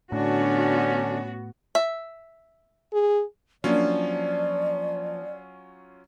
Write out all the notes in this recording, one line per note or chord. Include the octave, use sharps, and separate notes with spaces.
A2 D3 B3 C#4 D4 F#4
E5
G#4
F3 F#3 A#3 C#4 D4 F4 D5